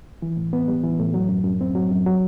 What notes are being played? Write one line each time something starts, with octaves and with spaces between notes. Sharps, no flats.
E3
A2
B3
G3
E3
A2
F#3
F#2
F#2
C4
F#3
F#2
F#3